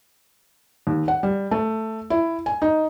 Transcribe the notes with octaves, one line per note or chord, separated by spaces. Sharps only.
D#2
F#5
G3
A3
E4
G#5
D#4